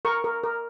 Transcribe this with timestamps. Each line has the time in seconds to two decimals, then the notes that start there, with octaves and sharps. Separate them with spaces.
0.05 A#4 C#6
0.24 A#4
0.44 A#4